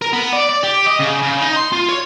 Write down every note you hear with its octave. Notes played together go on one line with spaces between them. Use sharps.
A#4
B3
D5
D5
G4
D#5
C#3
C#3
D#4
C6
F4
C#5